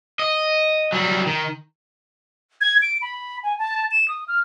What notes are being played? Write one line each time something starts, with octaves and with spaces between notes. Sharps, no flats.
D#5
F#3 G3
D#3
G#6
D7
B5
G#5
A5
E7
D#6
F6